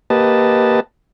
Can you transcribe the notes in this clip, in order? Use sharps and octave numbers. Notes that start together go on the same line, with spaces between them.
A#3 G4 B4 D#5 A5